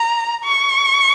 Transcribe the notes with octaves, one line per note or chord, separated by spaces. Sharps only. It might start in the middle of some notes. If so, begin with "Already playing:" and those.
Already playing: A#5
C#6